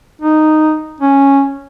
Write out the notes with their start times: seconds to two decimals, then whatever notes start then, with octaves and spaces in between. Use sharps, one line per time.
0.22 D#4
1.01 C#4